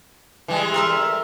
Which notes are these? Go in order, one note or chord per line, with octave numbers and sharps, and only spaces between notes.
E3 G3 G#3
A3 A#4 E5